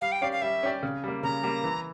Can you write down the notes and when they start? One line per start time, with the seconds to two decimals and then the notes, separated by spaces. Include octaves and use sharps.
0.01 G3 F5
0.12 G5
0.21 C#4 G4 D5 F5
0.32 F5
0.42 G3 E5
0.63 C#4 G4 D5
0.83 C#3
1.04 G3 A#3
1.23 C#3 A#5
1.43 G3 A#3
1.64 E3